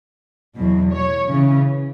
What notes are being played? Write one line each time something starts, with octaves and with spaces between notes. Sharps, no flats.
E2 B2 F#3
C#5
C#3 E3 C#4